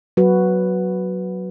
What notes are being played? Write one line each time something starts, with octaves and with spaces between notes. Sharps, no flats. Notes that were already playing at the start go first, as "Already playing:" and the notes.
F#3 F#4 B4